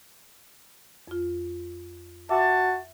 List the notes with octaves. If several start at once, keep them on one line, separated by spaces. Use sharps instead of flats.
F2 F4
F#4 E5 A5 D6